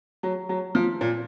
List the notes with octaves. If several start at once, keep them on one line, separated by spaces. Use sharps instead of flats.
F#3
F#3
F3
A#2